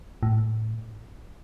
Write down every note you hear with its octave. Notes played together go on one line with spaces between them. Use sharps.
A2